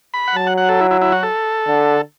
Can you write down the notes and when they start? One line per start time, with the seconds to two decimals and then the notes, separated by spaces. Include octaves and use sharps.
0.14 B5
0.28 F#5
0.35 F#3 A5
0.47 F#5
0.57 F#5
0.69 A4
0.80 E4
0.91 E4
1.02 E4
1.12 F#4
1.23 A4
1.68 D3